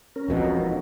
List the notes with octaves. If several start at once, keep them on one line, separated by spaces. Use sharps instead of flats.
C#4 A#4
E1 F2 B2
D#4